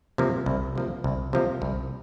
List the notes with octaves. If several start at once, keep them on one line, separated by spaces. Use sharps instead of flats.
C3 F3 A#3
C2
C3 F3 A#3
C2
C3 F3 A#3
C2